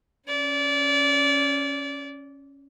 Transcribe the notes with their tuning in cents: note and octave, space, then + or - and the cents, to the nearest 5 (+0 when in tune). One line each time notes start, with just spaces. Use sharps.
C#4 +0 D5 -25